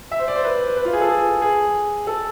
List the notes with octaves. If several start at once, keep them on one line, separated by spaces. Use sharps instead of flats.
E5
C5
D5
C5
B4
B4
F4
G#4
A4
G#4
G#4
A4